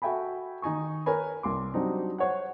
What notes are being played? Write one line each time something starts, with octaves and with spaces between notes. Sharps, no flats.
F#4 A4 E5 G5 G#5 B5
D#3 D#4 G#5 C#6
A#4 B4 C#5 G#5 B5
C2 C6 D6
F#3 G3 C4 D4 D#4
C5 C#5 F#5